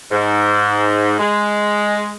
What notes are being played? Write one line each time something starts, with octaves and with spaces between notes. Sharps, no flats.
G#2
G#3